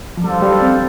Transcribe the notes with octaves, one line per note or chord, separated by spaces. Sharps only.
F3
G3 D4 A4 C5 F5
G3
C4